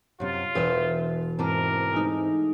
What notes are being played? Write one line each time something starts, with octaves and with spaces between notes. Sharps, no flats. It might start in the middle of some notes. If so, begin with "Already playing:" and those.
F#2 C3 F4
E1 B4 C5 E5
G#2 E3 C4 A#4 A5 D6
G#3 A3 D#4